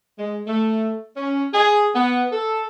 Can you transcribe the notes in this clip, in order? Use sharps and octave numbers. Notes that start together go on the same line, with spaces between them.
G#3
A3
C#4
G#4
B3
A4